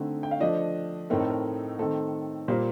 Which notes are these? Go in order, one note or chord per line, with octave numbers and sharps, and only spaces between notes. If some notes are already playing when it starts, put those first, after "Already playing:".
Already playing: D3 A3 C4 D#4
G5
F5
F3 A3 D4 D#5
A2 A3 C4 D#4 A#4
A4
A#4
D#3 A3 C4 A4
A#2 G3 A#3 C5